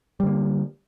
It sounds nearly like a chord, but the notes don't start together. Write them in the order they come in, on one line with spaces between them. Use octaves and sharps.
G3 D3 A#3